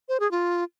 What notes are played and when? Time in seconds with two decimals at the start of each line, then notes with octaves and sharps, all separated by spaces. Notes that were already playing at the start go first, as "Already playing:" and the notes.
0.09 C5
0.20 G#4
0.31 F4